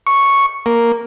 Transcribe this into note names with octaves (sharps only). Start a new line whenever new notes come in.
C#6
A#3